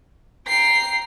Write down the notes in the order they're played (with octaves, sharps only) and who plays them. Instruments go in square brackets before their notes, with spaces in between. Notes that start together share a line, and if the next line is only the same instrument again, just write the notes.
[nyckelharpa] G5 A#5 [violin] C7